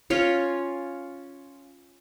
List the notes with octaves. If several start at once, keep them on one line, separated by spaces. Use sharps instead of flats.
C#4 F4 C#5